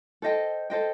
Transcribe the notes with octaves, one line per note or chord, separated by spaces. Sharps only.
A4 C5 D#5 G5
A4 C5 D#5 G5